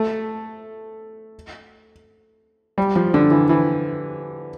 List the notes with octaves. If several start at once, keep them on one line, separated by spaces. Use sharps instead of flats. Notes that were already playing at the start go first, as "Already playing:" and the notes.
Already playing: A3
G3
F3
D3
E3
E3